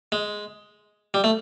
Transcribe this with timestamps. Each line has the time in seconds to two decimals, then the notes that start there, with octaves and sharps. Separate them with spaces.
0.12 G#3
1.14 G3
1.24 A3